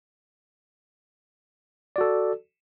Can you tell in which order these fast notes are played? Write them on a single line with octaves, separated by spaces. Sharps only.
D5 F#4 A4